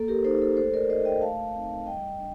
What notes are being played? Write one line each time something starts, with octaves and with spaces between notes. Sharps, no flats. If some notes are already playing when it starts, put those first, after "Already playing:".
Already playing: A#3 A4
G4 A#4
D#4 A4 C5
A4
A3 A4 C5
A#4 D5
D#4 C5 D#5
D#5 G5
A3 F5 A5
C4 D#4
G3 D#5 G5
D4